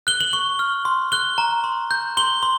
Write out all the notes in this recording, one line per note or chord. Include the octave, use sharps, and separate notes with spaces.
F#6 G7
F#7
C#6 G7
F6
C6
F#6 G7
A#5
C6
G6
C6 G7
C6